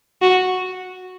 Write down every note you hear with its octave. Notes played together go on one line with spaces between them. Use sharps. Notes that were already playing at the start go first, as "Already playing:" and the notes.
F#4